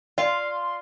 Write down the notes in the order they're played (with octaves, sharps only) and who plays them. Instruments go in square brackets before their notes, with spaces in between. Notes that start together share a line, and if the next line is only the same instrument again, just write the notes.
[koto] F4 F5 [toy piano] D5 [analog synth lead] C6